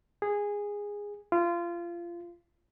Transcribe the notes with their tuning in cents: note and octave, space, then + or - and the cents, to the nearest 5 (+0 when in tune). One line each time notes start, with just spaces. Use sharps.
G#4 -15
F4 -25